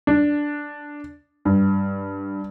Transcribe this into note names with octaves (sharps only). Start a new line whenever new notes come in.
D4
G2